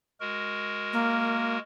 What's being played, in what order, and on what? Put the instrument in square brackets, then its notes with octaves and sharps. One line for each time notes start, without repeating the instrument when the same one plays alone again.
[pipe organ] G#3 F#4 A#4
[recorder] A#3